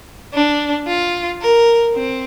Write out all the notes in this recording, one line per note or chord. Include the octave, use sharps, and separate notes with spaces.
D4
F4
A#4
C4